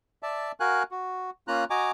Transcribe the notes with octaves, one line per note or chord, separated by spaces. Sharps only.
D5 E5 A5
F#4 A#4 F5 G#5 F#6
F#4
A#3 C#4 F4 A#5 F#6
F#4 D#5 G#5 A#5 D6